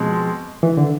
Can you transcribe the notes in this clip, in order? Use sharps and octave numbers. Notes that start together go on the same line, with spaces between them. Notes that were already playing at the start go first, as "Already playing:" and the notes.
Already playing: B2 F3 G#3 C4
E3
D3